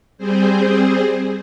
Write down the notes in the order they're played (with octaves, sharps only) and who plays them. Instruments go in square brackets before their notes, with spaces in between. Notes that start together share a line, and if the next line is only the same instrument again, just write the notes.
[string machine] G3 C4 G#4 C5